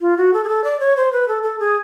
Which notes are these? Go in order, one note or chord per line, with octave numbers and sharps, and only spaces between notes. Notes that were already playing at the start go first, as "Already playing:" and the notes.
F4
F#4
A4
G#4
A4
D5
C#5
C5
B4
A4
A4
G#4